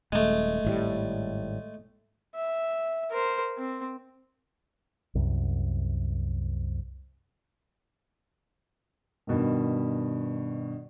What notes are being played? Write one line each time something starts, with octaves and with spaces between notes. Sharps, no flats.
D#1 G#3 A3
G#1 A2 G3
E5
A#4 C5
C4
C2 F#2
G2 B2 D#3